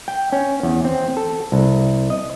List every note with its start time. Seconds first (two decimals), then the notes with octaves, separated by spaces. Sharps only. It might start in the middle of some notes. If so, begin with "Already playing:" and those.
0.08 G5
0.32 C#4
0.63 E2
0.85 C4
1.17 A4
1.52 C2
2.10 D#5